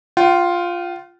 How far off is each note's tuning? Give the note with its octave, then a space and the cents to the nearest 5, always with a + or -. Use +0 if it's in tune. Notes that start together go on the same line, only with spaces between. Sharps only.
F4 +0 G5 -45